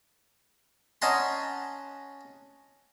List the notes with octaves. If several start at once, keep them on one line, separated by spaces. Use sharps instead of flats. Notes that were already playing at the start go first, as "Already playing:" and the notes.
C#4 D#5 F#5 A5 A#5 C6